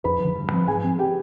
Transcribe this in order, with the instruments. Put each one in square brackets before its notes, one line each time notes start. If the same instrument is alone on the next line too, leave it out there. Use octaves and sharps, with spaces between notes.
[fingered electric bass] F2 [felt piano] B4 B5
[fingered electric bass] D3 F3
G2
F3 C4
[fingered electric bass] G#2 [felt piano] G#4 G#5
[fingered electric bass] F3 C4
[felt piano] G4 G5